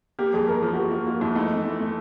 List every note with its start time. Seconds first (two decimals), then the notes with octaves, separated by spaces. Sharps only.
0.19 A#3 G4
0.33 F2 G#4
0.48 F2 A#4
0.62 F3 G#4
0.73 F#4
0.77 F3 G4
0.91 A#3 F#4
1.07 A#3 F4
1.21 F2 E4
1.35 A3 D#4
1.50 E3
1.65 A3
1.80 A3